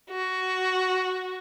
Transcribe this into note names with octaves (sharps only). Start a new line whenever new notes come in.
F#4